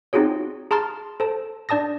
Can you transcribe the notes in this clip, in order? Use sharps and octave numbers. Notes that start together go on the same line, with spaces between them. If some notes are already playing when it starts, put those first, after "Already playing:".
C4 D#4 F4 F#4 G#4 C#5
G#4 A5 A#5 C6 F6 A6
A4 C5 A5
D4 D5 A5 D#6 A#6